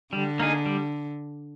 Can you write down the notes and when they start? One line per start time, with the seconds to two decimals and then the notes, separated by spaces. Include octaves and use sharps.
0.13 D3 G3
0.40 A#3 D#4 G#4
0.66 G3